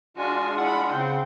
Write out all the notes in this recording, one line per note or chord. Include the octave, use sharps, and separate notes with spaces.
G#3 D4 F4 F#4 G#5
E4 F#5 B5
C#3 C4 G5